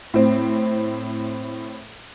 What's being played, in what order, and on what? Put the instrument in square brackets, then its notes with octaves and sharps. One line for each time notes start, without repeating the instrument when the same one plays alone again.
[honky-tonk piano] A2 C4